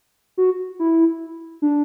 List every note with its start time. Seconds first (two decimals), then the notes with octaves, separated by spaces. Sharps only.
0.37 F#4
0.79 E4
1.62 D4